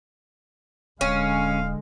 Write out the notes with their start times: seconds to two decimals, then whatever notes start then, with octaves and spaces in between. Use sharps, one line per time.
1.01 D1 D3 G#3 C#4 F5